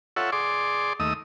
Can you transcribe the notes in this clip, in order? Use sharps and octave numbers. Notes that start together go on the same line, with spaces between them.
F4 A4 C#5 E5 F#5
G#4 D5 C6 D6
D#2 A3 D#5 D#6 E6